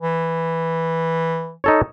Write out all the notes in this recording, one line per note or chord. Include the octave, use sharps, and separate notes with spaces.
E3
D#4 A4 C#5